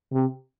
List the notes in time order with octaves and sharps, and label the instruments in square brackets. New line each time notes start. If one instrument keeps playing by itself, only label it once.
[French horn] C3